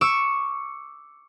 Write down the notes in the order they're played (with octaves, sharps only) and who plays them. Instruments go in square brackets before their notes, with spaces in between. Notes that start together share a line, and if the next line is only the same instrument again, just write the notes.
[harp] C#6 D6 E6